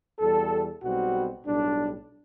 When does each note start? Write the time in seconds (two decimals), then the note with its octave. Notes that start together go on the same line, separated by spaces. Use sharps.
0.18 E2 B2 G3 A4
0.82 B1 B2 G3 C4 F#4
1.45 B1 A2 G3 D4